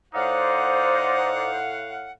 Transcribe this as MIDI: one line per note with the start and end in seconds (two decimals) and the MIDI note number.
0.14 2.12 45
0.14 1.59 63
0.14 1.57 72
0.14 1.59 74
0.14 2.12 77
0.14 2.12 78